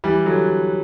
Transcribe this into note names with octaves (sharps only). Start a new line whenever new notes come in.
E3 G3
D3 F#3